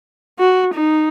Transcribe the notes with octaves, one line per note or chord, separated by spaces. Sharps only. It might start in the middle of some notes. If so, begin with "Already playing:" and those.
F#4
D#4